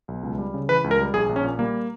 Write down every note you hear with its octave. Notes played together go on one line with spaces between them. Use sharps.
B1
C#2
G3
C#3
E3 B4
C#2
A#4
G3
A#1 G#4
A#1
C#4
A#2
G3 A#3